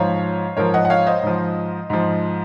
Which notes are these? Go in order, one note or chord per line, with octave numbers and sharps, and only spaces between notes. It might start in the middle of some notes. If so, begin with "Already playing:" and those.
Already playing: G#2 F3 C#5 F5
G#2 F3 A#4 C#5
D#5 F#5
F#5
C#5 F5
C5 D#5
G#2 F3
G#2 F3